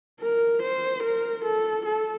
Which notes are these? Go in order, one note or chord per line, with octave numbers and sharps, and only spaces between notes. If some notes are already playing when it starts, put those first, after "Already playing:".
A#4
C5
A#4
A4
A4